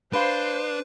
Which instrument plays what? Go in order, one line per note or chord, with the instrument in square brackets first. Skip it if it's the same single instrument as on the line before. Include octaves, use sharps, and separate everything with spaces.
[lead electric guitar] D4 [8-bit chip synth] B4 [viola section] C5 [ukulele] F5 B5